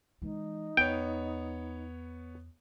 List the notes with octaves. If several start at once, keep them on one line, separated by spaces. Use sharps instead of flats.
E3 G#3 D#4
E2 B3 C#5 G5